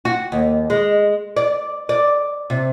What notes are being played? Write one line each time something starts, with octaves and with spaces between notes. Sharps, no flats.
F#4
D#2
G#3
D5
D5
C3